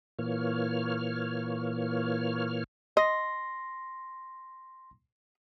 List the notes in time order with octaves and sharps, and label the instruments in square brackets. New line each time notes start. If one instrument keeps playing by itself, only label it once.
[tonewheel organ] A#2 E3 A#3 C#5 F6
[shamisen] D#5 [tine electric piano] C6 A#6